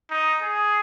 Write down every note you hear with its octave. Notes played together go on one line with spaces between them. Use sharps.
D#4
G#4